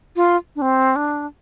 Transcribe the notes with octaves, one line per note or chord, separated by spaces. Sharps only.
F4
D4
C4
D4